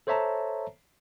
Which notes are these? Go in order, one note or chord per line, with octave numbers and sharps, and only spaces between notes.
A4 C5 C#5 E5 A5 A#5